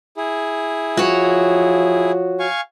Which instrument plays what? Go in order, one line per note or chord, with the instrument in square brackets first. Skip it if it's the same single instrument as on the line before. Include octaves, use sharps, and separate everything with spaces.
[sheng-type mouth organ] E4 G#4
[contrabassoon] F3 [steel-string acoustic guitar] F#4 C#5
[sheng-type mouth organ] F5 G#5 C#6